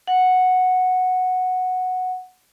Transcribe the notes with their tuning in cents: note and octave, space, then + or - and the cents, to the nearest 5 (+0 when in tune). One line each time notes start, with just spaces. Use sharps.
F#5 -5